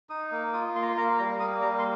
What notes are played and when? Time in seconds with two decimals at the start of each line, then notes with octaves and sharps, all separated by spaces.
0.10 D#4 D#6
0.31 A#3
0.53 F4 D#6
0.75 A#3 C6
0.82 A#5
0.89 C6
0.96 A#3 A#5
1.18 G3 A#5
1.40 A#3 D#6
1.62 G3 A#5
1.79 C6